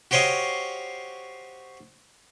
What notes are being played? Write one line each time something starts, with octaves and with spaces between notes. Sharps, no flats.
F#4 G4 C5 C#5 D#5 F5